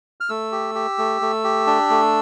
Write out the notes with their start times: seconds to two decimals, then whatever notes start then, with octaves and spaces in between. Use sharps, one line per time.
0.21 F6
0.29 A3 E6
0.52 G4
0.75 G4
0.98 A3
1.22 A3
1.44 G4
1.67 D4
1.90 A3